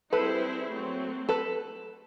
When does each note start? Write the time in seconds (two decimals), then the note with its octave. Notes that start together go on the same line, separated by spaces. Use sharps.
0.12 G3 C4 E4 G#4 A4 B4 C5
0.71 F#3 A3 C4
1.29 A4 B4